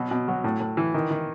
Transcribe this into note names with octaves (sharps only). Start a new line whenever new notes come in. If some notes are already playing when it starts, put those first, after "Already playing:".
Already playing: B2 F#3
B2
F#3
A2
A2
E3
D#3
D#3